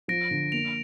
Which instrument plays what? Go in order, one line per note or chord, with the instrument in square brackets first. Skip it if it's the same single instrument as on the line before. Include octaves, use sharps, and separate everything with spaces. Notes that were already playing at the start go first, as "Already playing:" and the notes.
[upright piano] F3 [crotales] A#6 D7
[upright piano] D3
[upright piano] A#3 [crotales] D7 F7